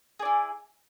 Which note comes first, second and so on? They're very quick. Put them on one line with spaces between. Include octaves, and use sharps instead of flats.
G#4 D5 E4